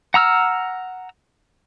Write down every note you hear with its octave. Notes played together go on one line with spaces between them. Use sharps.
F#5 A#5 E6 F6